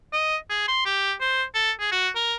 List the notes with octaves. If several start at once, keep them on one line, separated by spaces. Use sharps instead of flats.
D#5
G#4
C6
G4
C5
A4
G#4
F#4
A#4